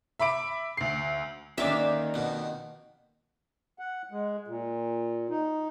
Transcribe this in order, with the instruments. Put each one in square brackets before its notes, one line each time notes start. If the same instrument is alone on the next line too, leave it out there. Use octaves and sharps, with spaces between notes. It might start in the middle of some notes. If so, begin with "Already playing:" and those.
[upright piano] E5 B5 D6 D7
D2 C7
[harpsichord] D2 [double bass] D#3 A#3 [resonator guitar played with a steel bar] C#4 D4 D5 [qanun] E5 F5
[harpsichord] F2 B2
[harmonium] F#5
G#3
A#2
D#4